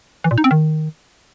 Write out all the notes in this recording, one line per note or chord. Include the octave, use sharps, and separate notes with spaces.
E3
A#2
D#4
C4
D#3